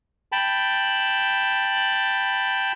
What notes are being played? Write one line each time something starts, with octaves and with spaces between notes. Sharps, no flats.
G5 A5 B5